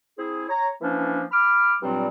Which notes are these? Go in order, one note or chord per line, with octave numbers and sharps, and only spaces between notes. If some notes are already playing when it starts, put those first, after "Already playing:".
C4 E4 G#4
C#5 A#5
E3 F3 A#3 C#4 D4
B5 D6 F6
G2 A#2 F#3 G3 C4